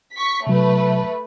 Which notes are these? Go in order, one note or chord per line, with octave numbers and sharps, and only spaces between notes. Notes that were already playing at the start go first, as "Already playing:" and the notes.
C#6 B6
C3 F#3 A3 B4